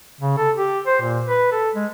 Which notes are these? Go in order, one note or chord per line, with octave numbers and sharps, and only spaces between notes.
C#3
A4
G4
C5
A#2
B4
A4
G#3